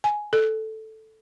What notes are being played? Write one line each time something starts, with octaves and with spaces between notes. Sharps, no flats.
G#5
A4